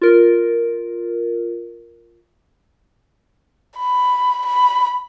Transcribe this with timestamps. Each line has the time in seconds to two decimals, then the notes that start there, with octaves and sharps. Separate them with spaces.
0.01 F4 A#4
3.78 B5
4.46 B5